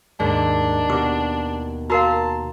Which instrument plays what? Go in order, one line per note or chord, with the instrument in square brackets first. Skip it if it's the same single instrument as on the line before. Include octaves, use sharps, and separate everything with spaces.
[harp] D#2 [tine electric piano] G#2 G#3 [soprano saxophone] D4
[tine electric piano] B2 B3 [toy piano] G4 D6
[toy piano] F#4 A#4 F5 [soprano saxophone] A5 [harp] A#5 C6 C7